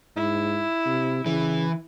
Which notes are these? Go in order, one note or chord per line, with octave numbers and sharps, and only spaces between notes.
G#2 E4
C3
C#3 E3